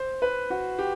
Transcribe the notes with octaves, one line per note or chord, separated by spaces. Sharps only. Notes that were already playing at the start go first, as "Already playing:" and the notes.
Already playing: C5
B4
F#4
G4